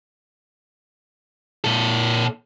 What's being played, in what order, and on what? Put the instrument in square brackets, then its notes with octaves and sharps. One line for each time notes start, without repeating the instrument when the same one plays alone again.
[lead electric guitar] A#2 A4